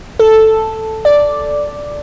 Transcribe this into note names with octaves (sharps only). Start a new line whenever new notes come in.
A4
D5